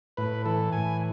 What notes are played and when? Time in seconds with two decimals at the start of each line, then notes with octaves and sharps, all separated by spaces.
0.17 A2 B4
0.45 E3 A4
0.72 A2 G#5